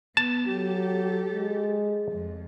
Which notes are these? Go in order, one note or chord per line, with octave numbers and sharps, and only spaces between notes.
B3 A5
F#3 G4 A4
G#3
F2